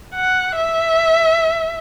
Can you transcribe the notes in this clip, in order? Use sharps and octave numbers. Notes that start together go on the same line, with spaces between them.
F#5
E5